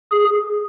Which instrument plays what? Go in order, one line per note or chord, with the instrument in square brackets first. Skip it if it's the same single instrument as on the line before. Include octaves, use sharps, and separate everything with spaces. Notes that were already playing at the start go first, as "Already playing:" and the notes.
[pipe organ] G#4